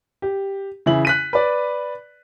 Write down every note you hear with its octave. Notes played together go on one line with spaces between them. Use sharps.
G4
C#3 E3 E4 F#7
F#6 B6 D#7
B4 D5